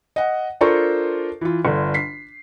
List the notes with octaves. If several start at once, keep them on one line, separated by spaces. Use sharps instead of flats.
D#5 F#5
D4 F4 A4 A#4 C5 C#6
E3 F4
G1 D3
B6 C7